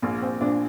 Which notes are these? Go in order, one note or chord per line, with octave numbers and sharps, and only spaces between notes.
A#1 A#3
A#1 C4
A#2 D4